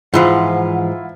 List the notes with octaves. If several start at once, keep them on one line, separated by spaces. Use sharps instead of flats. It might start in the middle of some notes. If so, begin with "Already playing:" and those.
G#2 E3 F3 E4 F4 F#5